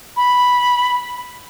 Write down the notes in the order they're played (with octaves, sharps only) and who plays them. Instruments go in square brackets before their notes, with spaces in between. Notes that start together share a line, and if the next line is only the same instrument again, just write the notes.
[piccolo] B5